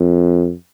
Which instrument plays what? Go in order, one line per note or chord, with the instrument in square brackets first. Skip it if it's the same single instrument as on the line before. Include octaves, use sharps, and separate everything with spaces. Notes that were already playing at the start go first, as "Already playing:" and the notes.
Already playing: [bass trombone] F2